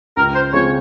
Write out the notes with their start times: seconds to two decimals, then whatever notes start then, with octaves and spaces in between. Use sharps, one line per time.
0.17 C#2 A#4
0.35 C5
0.53 C#3 G#3 C4 F4 C#5